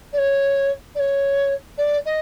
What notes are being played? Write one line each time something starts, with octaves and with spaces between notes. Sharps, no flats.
D5
C#5
D5
C#5
D5
D#5